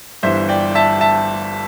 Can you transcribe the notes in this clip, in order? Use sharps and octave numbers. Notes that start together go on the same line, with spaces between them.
G1 G2 E3 C5 E5
D5 G5
E5 A5
E5 A5